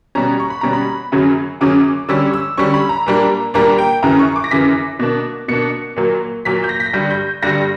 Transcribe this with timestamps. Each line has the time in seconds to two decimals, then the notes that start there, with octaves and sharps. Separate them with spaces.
0.15 B2 G3 C#4 A#5
0.40 C#6
0.50 B5
0.61 B2 G3 C#4 A#5
0.73 B5
1.12 F#2 C#3 F#3 C#4
1.61 F#2 C#3 F#3 C#4 D6
2.08 D3 G3 C#4 E6
2.33 E6
2.58 D3 G3 C#4 C#6
2.74 B5
2.89 A#5
3.06 A#2 G3 A#3 D4
3.54 A#2 G3 A#3 D4 A#5
3.78 G5
4.02 F#2 C#3 E3 A#5
4.19 C#6
4.36 D6
4.44 A#6
4.51 F#2 C#3 E3 B6
4.99 B2 A#3 D4
5.48 B2 A#3 D4 C#7
5.96 A#2 F#3 A#3
6.45 A#2 F#3 A#3 B6
6.64 G6
6.69 A#6
6.80 B6
6.86 A#6
6.94 G2 D3 G3 G6
7.10 G6
7.43 G2 D3 G3 A#6